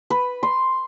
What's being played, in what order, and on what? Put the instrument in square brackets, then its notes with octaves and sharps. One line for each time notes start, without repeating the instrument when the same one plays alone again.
[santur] B4
C6